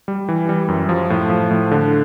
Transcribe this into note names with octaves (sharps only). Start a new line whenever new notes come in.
G3
E3
G3
F#2
F3
A2
F3
A2
D3